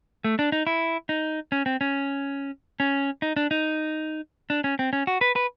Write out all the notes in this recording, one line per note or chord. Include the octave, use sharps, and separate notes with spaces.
A3
D4
D#4
E4
D#4
C#4
C4
C#4
C#4
D#4
D4
D#4
D4
C#4
C4
C#4
F#4
B4
B4